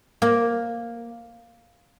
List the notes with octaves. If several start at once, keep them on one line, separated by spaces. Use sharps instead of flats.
A#3